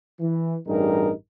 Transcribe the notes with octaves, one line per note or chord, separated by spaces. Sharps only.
E3
A1 G2 G3 D#4 G#4 A#4